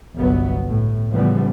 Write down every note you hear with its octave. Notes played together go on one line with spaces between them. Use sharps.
G1 C2 F#3 B3
A2
A2 C#3 E3 F3 G3 B3